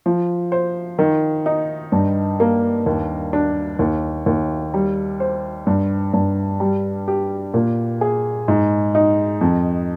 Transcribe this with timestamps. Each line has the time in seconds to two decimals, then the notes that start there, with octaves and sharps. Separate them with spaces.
0.06 F3
0.52 C5
0.99 D#3
1.46 D#4
1.92 G2
2.40 A#3
2.86 D#2
3.33 D4
3.79 D#2
4.26 D#2
4.74 G3
5.20 C5
5.67 G2
6.13 G2
6.60 G3
7.08 G4
7.54 A#2
8.01 G#4
8.48 G#2
8.95 D#4
9.41 F2